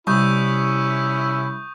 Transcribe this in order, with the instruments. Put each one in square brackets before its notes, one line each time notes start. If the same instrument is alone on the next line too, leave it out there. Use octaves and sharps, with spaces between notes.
[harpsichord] C2 [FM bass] G3 [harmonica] C#4 E4 E5 [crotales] C#6 D#6 G6